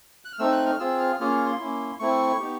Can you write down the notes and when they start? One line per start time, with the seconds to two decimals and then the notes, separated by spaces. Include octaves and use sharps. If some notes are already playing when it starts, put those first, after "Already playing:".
0.25 F#6
0.33 F6
0.39 A3 C4 D#4 E6
0.52 F#6
0.66 F6
0.79 C4 F4 G#4 E6
1.00 F6
1.20 A#3 C#4 F4 G#4 F6
1.33 F6
1.46 C6
1.59 A#3 C#4 E4
1.99 A3 C4 E4 C#6
2.40 B3 D#4 G4